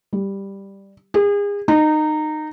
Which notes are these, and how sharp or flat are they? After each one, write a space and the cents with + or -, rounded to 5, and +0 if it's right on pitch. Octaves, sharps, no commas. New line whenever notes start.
G3 +5
G#4 -35
D#4 -20